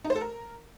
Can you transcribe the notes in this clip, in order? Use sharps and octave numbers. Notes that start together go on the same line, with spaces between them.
D#4
C5
A4
A#4